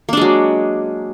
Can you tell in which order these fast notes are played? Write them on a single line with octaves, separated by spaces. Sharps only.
A#3 D4 G#3 F#3